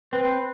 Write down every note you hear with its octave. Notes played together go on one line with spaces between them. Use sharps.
C4 B4